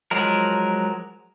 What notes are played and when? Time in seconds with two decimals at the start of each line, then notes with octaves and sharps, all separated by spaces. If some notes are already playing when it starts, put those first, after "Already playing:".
0.11 F3 F#3 G#3 A#4